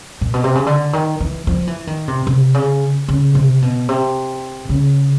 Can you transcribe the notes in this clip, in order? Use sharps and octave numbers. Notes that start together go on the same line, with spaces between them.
A#2
B2
C3
C#3
D3
D#3
E3
F3
E3
D#3
C3
C3
C#3
C#3
C3
B2
C3
C#3